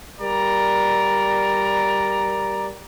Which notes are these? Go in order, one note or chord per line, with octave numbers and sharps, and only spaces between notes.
G3 A#4 D5 A#5